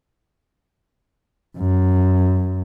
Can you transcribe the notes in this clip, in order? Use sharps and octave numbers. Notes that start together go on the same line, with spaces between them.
F#2